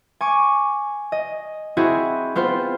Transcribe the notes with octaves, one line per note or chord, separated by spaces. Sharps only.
G#5 C#6 D6
D#5
C4 E4 F#4 G#4
B3 C4 F4 C5